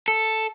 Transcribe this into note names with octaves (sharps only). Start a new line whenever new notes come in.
A4